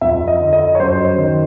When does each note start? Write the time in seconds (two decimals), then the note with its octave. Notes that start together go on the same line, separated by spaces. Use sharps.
0.01 F2 E5
0.28 D#5
0.40 D3
0.53 D#5
0.75 C#5
0.79 F#2 C5
1.18 D#3